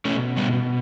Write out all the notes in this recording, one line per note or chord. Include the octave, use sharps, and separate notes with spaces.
B2 A3 C#4
G3 B3
B2